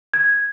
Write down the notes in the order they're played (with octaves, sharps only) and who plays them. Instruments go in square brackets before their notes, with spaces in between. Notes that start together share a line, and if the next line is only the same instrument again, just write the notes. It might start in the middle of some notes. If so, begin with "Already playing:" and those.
[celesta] G#6